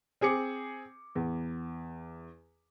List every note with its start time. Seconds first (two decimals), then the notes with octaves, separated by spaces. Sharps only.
0.21 C4 G#4 D6 C#7
1.15 E2